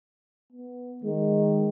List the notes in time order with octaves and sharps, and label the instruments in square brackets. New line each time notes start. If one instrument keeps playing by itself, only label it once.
[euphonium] B3
[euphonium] D#3 [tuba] G#3